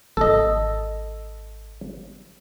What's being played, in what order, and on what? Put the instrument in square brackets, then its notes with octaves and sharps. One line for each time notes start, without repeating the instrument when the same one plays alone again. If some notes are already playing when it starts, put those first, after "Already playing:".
[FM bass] G#1 [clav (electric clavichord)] A4 D#5